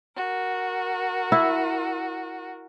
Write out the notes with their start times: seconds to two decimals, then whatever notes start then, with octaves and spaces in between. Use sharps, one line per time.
0.14 F#4 A#4
1.32 E4